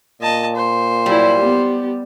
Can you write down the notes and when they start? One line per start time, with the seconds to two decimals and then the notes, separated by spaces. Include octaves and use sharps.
0.22 A#2 D#5 A5
0.56 C5
1.06 F#3 G3 E4
1.38 B3 G4